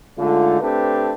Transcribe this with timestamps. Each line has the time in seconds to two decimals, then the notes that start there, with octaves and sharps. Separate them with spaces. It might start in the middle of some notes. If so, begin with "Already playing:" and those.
0.18 D3 G#3 A3 D#4 F4
0.61 A3 C4 D4 G4 A4 B4